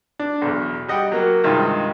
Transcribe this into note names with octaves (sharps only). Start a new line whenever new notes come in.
D4
B1 E2
G3 D#5 F#5 G5
F#3 A#3
G2 C3 D#3 G#3 D#4 F4